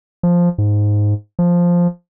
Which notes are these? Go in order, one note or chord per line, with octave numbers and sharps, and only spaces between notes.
F3
G#2
F3